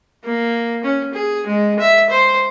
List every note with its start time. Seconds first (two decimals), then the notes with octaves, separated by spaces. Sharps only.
0.24 A#3
0.84 C#4
1.14 G#4
1.47 G#3
1.79 E5
2.10 C5